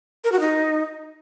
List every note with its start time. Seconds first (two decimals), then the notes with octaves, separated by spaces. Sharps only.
0.24 A#4
0.32 F#4
0.40 D#4